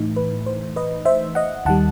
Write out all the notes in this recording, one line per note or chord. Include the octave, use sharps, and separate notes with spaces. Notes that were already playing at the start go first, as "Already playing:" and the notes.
Already playing: A2 E3 A3 D#4
B4
C5
B4 D#5
C5 E5
D#5 F#5
D#2 D#3 G3 F#5 A5